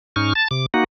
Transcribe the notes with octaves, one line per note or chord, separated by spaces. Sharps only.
G#2 C#4 D#4 C#6 F6
A5 A6
C3 D6
A#3 D#4 F#4 F#5